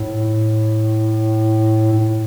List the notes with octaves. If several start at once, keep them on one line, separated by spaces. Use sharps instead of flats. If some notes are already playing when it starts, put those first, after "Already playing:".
Already playing: A2
A2